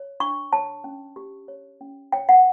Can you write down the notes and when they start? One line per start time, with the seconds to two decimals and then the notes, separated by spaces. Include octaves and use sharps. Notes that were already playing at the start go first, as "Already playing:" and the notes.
Already playing: C#5
0.20 D4 C#6
0.52 C#5 A5
0.84 C#4
1.16 G4
1.48 C#5
1.81 C#4
2.12 C#5 G5
2.29 F#5